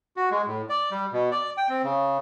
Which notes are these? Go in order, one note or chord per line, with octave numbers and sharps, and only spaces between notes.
F#4
G#3
A2
D5
G3
B2
D5
G5
C4
C#3